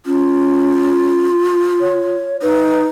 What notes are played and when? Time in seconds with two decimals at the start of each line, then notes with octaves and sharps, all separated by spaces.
0.06 C#4 F4
1.81 C#5
2.42 D#4 B4